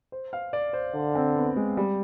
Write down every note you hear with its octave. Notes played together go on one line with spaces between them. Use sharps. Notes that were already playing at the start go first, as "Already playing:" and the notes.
C5
F5
D5
C5
D3
C4
B3
G#3
G3